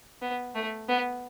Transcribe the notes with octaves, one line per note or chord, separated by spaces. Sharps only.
B3
A3
B3